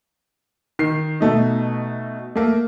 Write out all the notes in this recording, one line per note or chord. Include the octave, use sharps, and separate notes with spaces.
D#3 C7
B2 A3 D#4
A3 A#3